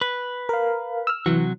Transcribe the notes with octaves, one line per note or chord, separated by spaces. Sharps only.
B4
A#4 F5
E6 F6
C3 E3 F#3 F#4